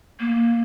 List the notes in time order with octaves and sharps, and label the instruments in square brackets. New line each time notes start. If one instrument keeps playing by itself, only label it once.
[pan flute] A#3